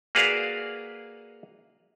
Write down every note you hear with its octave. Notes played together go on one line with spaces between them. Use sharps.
A#3 F#4 G#4 B4 D5 F5